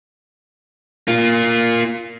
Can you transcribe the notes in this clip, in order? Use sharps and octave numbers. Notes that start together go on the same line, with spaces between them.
A#3 F4